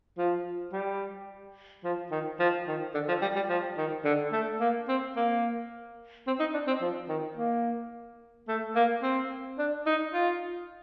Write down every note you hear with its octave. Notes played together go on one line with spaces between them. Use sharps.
F3
G3
F3
D#3
F3
D#3
D3
F3
G3
G3
F3
D#3
D3
A3
A#3
C4
A#3
C4
D#4
D4
C4
F3
D#3
A#3
A3
A#3
C4
D4
D#4
F4